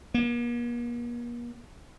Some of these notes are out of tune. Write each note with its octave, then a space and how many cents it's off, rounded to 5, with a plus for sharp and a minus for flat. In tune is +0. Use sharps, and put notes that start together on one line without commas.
A#3 +45